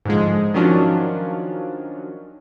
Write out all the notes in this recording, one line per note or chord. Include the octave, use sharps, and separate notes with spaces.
G#2 D3 F3 G#3
D#3 F3 F#3 C#4 D4 F4